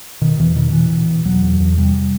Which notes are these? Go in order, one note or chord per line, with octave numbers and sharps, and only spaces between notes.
B2 D#3
E2 E3
B2 D#3
B2 E3
B2
B2
E2 F#3
E2
E2
C3 G3